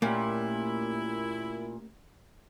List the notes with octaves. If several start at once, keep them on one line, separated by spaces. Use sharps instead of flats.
A#2 A3 A#3 C#4 E4 G4